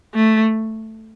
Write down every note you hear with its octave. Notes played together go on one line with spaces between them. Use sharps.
A3